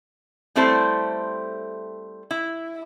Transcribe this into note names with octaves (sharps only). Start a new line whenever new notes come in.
G3 A3 C4 E4 A4 C5
E4